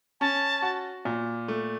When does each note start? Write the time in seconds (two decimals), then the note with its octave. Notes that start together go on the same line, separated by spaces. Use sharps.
0.21 C#4 A5
0.62 F#4
1.05 A#2
1.48 A3